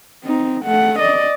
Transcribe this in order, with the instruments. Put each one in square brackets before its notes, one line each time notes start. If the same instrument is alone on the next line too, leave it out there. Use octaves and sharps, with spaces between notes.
[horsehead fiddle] C4 D#4
A3 F#5
D5 D#5